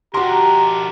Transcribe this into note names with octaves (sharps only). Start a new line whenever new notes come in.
D4 F#4 G4 A#4 A#5 C6